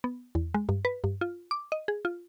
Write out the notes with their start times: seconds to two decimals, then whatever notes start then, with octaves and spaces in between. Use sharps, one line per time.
0.04 B3
0.35 E2
0.54 G#3
0.69 G2
0.85 B4
1.04 G2
1.21 F4
1.51 D6
1.72 D#5
1.88 G#4
2.05 F4